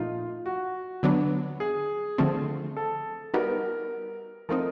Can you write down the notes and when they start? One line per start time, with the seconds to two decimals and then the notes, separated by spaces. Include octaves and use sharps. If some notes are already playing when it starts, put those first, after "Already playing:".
Already playing: A#2 F3 A3 D#4 F4
0.46 F#4
1.03 D3 F#3 B3 D4
1.60 G#4
2.18 D3 F3 A3 C4
2.77 A4
3.34 G3 B3 D#4 F#4 A#4
4.49 F3 A3 C4 D#4 A#4